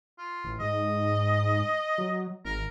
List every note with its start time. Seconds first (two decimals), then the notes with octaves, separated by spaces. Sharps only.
0.18 F4
0.44 A1
0.60 G#2 D#5
1.98 F#3
2.45 G#1 A#4